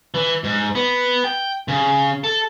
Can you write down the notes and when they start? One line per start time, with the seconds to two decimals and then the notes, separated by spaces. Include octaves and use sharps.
0.14 E3
0.44 G#2
0.75 B3
1.24 G5
1.68 C#3
2.24 A4